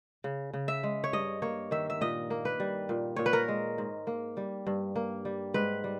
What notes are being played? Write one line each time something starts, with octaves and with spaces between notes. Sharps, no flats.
C#3
C#3
E5
G#3
C#5
G2 D#5
A#3 C#5
D#3 E5
E5
A#2 D#5
A#3
B4
G3
A#2
A#2 C#5
B4
A#4
G#3
G#2
A#3
G3
G2
A#3
G3
G#2 B4
G3